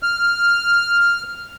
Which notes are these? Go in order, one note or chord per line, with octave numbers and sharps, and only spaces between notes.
F6